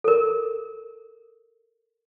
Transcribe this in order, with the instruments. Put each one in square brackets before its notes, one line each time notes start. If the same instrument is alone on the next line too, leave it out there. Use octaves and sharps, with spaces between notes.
[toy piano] A4 A#4